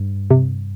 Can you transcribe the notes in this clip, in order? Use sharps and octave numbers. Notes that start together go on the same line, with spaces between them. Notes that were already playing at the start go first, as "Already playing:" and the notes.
Already playing: G2
C3